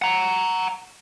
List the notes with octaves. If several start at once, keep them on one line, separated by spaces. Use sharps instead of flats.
F#5 A#5